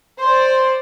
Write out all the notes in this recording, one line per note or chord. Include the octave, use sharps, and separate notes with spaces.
C5 D5